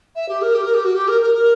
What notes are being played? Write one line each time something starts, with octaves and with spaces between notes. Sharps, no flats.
E5
G4
A#4
G4
A#4
G4
F#4
G4
A#4
A#4
A#4